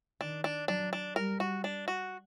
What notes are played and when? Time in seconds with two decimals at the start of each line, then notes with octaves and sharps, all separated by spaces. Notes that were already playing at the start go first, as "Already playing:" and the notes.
0.21 D#3 D4
0.44 D4
0.68 F#3 D4
0.93 D4
1.16 G3 A#4
1.40 F#4
1.64 D4
1.88 F#4